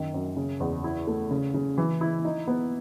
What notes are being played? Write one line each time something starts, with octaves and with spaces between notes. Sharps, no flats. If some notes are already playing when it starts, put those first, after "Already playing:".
Already playing: F#2 D#3
F#2
C#3
E2
E4
A3
C#3
C#3
E3
E4
D#4
B3